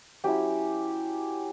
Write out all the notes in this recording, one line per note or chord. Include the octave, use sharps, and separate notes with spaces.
F#3 C#4 E4 G4